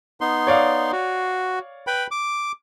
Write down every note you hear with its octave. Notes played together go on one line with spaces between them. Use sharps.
B3 D#4 C6
C#5 D5 F5
F#4
B4 G5 B5
D6